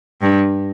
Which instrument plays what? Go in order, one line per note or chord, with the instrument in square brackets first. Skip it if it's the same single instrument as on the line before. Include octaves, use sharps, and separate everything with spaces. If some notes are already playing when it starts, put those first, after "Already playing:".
[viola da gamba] G2